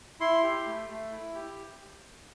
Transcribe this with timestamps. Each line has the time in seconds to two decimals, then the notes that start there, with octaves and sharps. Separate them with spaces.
0.20 E4 C6
0.43 G4
0.66 A3
0.89 A3
1.12 E4
1.35 G4